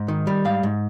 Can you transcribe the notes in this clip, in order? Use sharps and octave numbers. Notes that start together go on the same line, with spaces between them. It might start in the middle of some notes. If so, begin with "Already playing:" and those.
Already playing: G#2
D#3
G3
G#2 F5
G#2